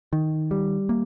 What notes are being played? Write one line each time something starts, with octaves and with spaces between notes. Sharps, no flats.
D#3
G3
A#3